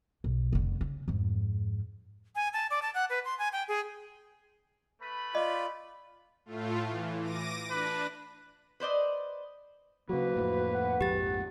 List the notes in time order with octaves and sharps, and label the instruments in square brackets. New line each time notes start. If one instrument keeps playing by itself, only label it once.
[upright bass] B1
F1 D3
C#3
F2 G#2
[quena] G#5
A5
D5
A5
F#5
B4
C6
G#5
G5
G#4
[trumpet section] A3 B4 B5
[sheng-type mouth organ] F4 D5 [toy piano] D#5
[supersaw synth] A2 A3 F4
E3
D6 A#6 D#7
[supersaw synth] D4 [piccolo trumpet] B4
[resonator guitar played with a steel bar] B4 C5 D5 D#5
[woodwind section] D2 A#3 B4 [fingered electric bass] C#3 F#3 [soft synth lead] F#4
[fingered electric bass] F2 A2
[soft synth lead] F#5
[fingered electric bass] A#1 F2 G#2 [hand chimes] G4 A6